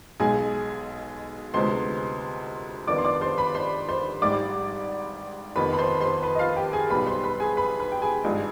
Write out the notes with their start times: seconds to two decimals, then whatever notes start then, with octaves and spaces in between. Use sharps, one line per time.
0.20 B1 B2 G#3 G#4 G#5
1.54 D2 C3 F3 G#3 B3 C5 C6
2.87 G1 F2 D#3 B3 D5 D6
2.98 C6
3.05 D5 D6
3.21 C5 C6
3.38 B4 B5
3.55 C5 C6
3.89 C5 C6
4.22 G#1 G#2 G3 D5 D6
5.56 F1 F2 D#3 B3 B4 B5
5.73 B5
5.78 C5 C6
6.00 C5 C6
6.23 B4 B5
6.35 D#5
6.39 F4 F5
6.56 G4 G5
6.73 G#4 G#5
6.89 B1 B2 G3 B3 B4 B5
7.07 C5 C6
7.24 B4 B5
7.40 G#4 G#5
7.57 B4 B5
7.79 B4 B5
7.92 G5
8.02 G#4 G#5
8.24 G#1 G2 F3 G#3